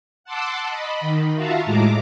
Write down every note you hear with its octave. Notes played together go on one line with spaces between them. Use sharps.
F#5 A5 C6 D6 E6
D#5 B5
D#3
F4 F#4 E5 F5 A5 A#5
A2 G#3 A#5 D6